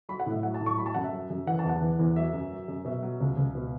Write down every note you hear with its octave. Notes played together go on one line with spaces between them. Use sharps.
F#3 B5
F#5
A2
E5
F#3 F#5
A5
A2
C#6
F#3 B5
A5
F#2 F#5
E5
F#3
F#2
E3 F#5
A5
E2
F#5
E3
E2
F#3 E5
F#2
F#3
F#2
B2 E5
F#3
C#2
C#2
B2